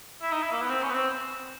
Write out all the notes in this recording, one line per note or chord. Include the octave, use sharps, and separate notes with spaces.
E4
D#4
E4
A#3
B3
C4
C#4
B3
C4